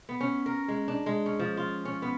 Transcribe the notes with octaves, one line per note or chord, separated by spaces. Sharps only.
B3
C#4
A#4
G#3
D4
G#3
C#4
F3
F4
C#4
B3